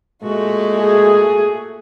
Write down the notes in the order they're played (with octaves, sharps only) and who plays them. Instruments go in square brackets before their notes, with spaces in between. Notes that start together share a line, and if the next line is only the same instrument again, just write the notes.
[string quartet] A#2 A3 F#4 [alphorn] G#3
[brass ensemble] G#4